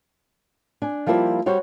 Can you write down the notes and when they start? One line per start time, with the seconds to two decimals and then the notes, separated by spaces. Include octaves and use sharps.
0.82 D4 G#5
1.06 F3 G3 A#3 E4 C5
1.46 G3 F#4 G4 C5 C#5